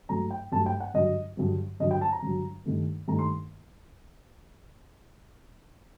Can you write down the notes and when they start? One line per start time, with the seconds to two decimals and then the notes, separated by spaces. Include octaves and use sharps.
0.09 G2 F#3 A3 A#5
0.31 G5
0.52 G2 F#3 A3 A5
0.66 G5
0.80 F#5
0.94 G2 D3 F#3 D#5
1.37 G2 D3 F#3
1.80 G2 D3 F#3 D#5
1.91 G5
2.01 A5
2.12 A#5
2.22 G2 D3 F#3
2.66 G2 D#3 A3
3.08 G2 D#3 A3 A#5
3.19 C6